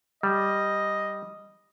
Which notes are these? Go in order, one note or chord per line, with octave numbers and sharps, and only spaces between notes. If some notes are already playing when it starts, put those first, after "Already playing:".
G3 D#5